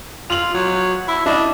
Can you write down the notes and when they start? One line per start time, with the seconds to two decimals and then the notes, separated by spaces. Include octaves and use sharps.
0.30 F4 F7 F#7
0.54 F#3
1.08 E4
1.26 D4 E4 D#5